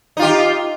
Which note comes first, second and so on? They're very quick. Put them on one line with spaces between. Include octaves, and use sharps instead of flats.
D#4 F4 G4